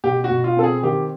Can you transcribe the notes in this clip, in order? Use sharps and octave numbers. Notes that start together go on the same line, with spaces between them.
B2 G4
F#4
B2
F4
C4 A4
G#4
D#3 G4